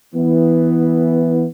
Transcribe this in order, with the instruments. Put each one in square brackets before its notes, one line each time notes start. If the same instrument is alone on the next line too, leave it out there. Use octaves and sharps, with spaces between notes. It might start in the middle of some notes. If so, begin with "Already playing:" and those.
[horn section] E3 B3